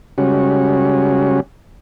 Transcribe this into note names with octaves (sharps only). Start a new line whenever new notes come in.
C#3 G3 G#3 C#4 F#4